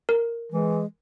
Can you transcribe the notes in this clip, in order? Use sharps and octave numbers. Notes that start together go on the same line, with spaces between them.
A#4
E3 G#3